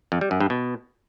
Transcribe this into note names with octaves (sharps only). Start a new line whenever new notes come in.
F2
G3
F#2
G2
B2